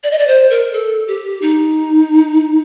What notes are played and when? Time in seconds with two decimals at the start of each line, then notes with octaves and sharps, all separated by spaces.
0.04 D5
0.11 D#5
0.18 D5
0.27 C5
0.50 A#4
0.73 A4
1.08 G4
1.42 D#4